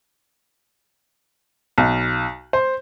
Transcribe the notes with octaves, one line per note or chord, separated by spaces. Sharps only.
B1
C5